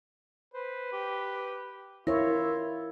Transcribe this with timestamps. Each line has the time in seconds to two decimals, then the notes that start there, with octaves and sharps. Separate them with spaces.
0.54 B4 C5
0.92 G4
2.07 E4 F4 A#4 C#5 E5